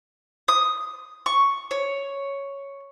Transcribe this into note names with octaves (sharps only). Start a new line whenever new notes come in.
D#6
C#6
C#5